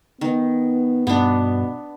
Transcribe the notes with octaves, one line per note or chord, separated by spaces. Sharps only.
D#3 B3
G2 B2 B3 D4